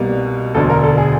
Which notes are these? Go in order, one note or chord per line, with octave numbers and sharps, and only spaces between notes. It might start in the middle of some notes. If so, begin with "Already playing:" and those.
Already playing: C2 B2 G3 A#3
E1 D2 D3 A4
A#4
A4
G#4